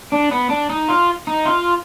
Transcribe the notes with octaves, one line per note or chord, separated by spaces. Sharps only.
D4
B3
D4
D#4
F4
D#4
F4